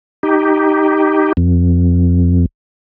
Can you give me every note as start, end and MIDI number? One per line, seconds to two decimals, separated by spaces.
0.23 1.33 63
0.23 1.33 67
1.37 2.46 41